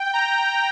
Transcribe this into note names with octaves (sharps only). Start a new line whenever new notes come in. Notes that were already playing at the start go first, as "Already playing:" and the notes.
Already playing: G5
A#5